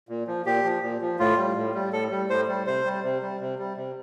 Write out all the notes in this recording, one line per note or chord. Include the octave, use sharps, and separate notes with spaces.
A#2
F3
A#2 G4
F3
A#2
F3
A2 F4
G3
A2
G3
A2 A4
G3
A2 C5
G3
C3 C5
G3
C3
G3
C3
G3
C3